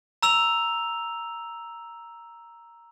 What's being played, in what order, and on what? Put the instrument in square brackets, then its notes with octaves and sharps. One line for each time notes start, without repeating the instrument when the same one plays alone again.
[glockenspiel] A#5 E6 F7